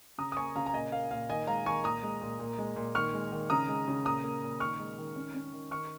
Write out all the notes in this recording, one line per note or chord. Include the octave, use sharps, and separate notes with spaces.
C#3 A#5 D#6
D#6
A#3 G#5 C#6
C#3 F5 A#5
A#5
A#2 D#5 G#5
A#3 F5
A#2 F5
D#3 D#5 G#5
G#3 F5 A#5
D#3 G#5 C#6
A#2 A#5 D#6
G#3
A#2
A#2
G#3
A#2
D#3 C#6 F6
G#3
D#3
C#3 A#5 D#6
G#3
C#3
A#2 A#5 D#6
A#3
A#2
D#3 C#6 F6
G#3
D#3
C#4
C#4
D#3
D#3 C#6 F6